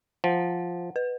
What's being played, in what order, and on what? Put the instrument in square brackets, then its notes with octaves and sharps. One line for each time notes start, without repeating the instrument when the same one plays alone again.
[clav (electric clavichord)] F3 [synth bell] F#5
[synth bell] B4